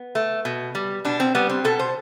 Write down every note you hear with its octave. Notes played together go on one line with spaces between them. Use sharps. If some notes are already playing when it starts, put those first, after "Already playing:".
Already playing: B3
A3
B2
G3
B2 D4
C4
G3 B3
C4
B2 A4
C5